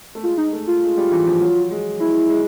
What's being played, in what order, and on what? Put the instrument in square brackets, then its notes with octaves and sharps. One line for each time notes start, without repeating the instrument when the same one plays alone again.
[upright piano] A3
[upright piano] G#3 [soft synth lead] F4
[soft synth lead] D#4
[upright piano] A3
[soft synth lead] F4
[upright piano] G#3
G3
E3
F3
F#3
G#3
[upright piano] G#3 [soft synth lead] E4
[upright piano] G#3